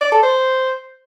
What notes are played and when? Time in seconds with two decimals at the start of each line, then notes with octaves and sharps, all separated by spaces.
0.01 D5
0.12 A4
0.23 C5